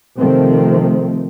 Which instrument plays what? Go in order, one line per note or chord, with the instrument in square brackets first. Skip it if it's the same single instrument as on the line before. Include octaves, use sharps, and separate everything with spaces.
[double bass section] C3 D#3 F3 A3 C4